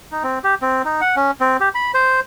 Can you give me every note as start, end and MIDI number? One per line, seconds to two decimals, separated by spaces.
0.11 0.23 63
0.23 0.39 60
0.44 0.55 67
0.62 0.82 60
0.85 1.01 63
1.01 1.15 78
1.16 1.31 61
1.40 1.57 60
1.60 1.69 67
1.75 1.92 83
1.94 2.20 72